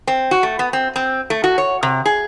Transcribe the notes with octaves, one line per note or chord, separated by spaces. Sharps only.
C4
F#4
A3
B3
C4
C4
A3
F#4
C#5
C3
G#4